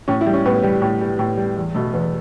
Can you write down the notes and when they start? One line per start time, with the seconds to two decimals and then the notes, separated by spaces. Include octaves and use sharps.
0.08 A2 C#4
0.21 E4
0.26 G3
0.33 C#4
0.45 A2 B3
0.63 G3
0.82 A2
1.01 G3
1.19 A2
1.37 G3
1.57 E2
1.74 B2 A3
1.93 E2 B3